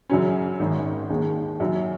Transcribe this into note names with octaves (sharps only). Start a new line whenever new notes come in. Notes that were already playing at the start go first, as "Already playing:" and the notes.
F#2 C#3 F#3 C#4
G#1 G#2 D#3
D#2 D#3 G#3
F#2 F#3 C#4